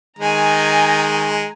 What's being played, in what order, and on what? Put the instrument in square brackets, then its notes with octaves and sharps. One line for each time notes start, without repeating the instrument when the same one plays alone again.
[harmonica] D#3 G#3 [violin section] G#5 A#5